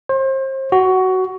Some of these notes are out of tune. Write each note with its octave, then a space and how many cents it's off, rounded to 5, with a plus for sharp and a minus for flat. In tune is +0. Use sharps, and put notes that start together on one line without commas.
C5 +35
F#4 +15